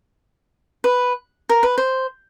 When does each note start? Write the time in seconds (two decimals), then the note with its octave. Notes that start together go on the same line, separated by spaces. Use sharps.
0.84 B4
1.49 A#4
1.63 B4
1.78 C5